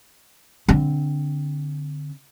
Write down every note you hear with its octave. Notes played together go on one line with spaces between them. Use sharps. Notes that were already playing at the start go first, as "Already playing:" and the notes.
D3 C4